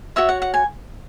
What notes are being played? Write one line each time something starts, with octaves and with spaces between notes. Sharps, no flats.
F#4 C#5 E5
F#5
F#5
G#5